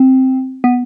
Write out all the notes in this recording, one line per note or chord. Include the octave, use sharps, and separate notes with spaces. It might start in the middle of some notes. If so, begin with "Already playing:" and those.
Already playing: C4
B3